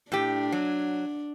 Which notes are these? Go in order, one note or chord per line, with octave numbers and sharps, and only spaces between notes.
A2 D4 G4
F#3